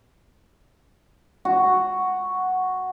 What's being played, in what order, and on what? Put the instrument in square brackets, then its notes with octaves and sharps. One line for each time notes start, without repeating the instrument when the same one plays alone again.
[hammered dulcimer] F#4